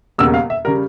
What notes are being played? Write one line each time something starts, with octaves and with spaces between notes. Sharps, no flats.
E1 E2 C#3 G3 A#3 E6
F5
E5
C#3 G3 A#4